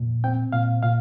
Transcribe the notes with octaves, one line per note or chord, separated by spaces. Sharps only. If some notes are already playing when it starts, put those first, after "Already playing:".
Already playing: F2 A#2
C4 G5
A#2 F5
A#2 F5